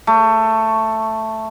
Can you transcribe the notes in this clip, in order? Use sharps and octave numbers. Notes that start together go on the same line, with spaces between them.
A3